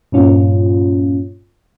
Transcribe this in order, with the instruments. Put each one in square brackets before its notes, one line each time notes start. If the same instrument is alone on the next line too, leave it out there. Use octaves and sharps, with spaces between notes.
[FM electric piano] G2 A#2 C#4 F4